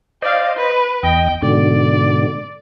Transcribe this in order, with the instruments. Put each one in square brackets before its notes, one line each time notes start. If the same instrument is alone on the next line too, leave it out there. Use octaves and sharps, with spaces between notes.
[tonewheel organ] C5 D#5 [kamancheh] D5 F5
[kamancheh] B4
[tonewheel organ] E2 D#5 [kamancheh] G5
[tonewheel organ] G#2 B2 D3 [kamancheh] D5